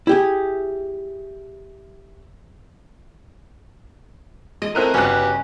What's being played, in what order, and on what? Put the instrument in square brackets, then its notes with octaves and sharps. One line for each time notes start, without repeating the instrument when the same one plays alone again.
[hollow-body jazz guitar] E4 G4 G#4
[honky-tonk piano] G#3 [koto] D#5
[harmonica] A3 E4 A#4 [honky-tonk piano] C4 F#6 D#7
[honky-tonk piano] G1 F#6 [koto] C#3 C#4 [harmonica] F#4 G4 B4